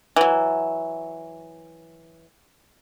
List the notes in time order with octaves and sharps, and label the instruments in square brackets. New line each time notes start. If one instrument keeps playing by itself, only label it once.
[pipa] E3 F#3